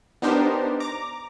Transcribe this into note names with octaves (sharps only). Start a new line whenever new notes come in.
B3 D4 D#4 G4 A#4 C5
A#5 D6